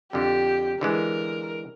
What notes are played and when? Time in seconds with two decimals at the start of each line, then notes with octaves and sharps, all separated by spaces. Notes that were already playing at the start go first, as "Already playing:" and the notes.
0.13 F2 D3 G4
0.81 D3 E3 G#3 A#4